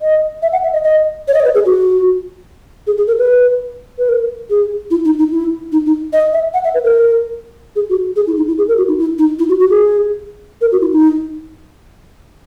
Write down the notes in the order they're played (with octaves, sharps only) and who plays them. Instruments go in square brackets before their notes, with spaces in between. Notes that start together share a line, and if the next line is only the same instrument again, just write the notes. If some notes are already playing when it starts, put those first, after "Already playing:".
[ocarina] D#5
E5
F#5
E5
D#5
D#5
C#5
D#5
C#5
B4
G#4
F#4
G#4
G#4
A#4
B4
B4
A#4
G#4
E4
D#4
D#4
E4
D#4
D#4
D#5
E5
F#5
E5
B4
A#4
G#4
F#4
G#4
E4
D#4
E4
G#4
A#4
F#4
D#4
E4
D#4
E4
F#4
F#4
G#4
A#4
F#4
E4
D#4